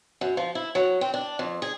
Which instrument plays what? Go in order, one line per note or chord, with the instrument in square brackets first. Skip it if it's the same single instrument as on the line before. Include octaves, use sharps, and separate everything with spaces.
[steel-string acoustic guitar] F#2
F3
E4
F#3
C4
D4
F2
G#4